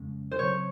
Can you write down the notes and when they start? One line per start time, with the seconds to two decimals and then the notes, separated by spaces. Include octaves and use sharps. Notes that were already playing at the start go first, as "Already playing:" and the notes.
Already playing: F2 C#3 G#3 C#4
0.31 C5
0.39 C#3 F#3 C4 C#5